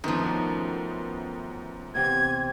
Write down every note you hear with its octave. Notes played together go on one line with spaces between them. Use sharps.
F#2 D#3 F3 A3 B3
E2 C3 G#6